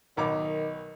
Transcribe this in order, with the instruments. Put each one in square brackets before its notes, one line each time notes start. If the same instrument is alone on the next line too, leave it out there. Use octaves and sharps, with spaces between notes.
[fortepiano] B1 A#5 D6 [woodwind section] D#3